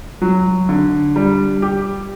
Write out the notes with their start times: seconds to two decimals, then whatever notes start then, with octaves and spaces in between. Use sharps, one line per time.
0.22 F#3
0.69 D3
1.16 G3
1.62 G4